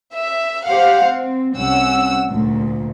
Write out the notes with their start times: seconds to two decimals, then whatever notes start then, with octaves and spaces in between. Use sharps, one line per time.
0.16 E5
0.65 G4 C5 F5 F#5
1.05 C4
1.57 C2 C#4 F#5 E6
2.31 D2 A#2